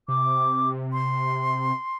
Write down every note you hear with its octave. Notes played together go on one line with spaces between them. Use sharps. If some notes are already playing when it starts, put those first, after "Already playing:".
C3 D6
C6